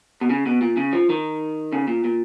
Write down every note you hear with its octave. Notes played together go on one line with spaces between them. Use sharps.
B2
C#3
B2
A#2
C#3
F3
D#3
C#3
A#2
A#2